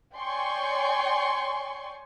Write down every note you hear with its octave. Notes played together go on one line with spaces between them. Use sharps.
C#5 D5 G5 G#5 C6 C#6